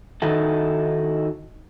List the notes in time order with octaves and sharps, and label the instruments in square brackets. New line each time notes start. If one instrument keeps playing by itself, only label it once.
[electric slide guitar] D#3 D#4 E4 F#4 A4